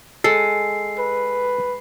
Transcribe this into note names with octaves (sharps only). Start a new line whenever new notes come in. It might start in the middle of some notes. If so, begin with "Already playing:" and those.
G#3 A4 C7
B4